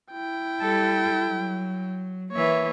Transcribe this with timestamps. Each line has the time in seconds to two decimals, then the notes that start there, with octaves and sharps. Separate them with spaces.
0.12 E4 G5
0.61 G3 A4
1.27 F#3
2.32 E3 A#3 C#5 E5